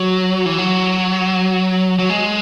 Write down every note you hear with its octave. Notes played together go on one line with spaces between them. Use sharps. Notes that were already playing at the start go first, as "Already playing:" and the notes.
Already playing: F#3
E3
F#3
F#3
G#3